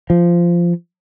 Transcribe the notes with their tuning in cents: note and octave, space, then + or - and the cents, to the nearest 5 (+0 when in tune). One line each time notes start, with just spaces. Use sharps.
F3 -15